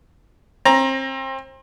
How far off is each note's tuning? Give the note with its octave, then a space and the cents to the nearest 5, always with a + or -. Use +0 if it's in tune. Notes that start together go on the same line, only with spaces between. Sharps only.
C4 +30 A#5 +10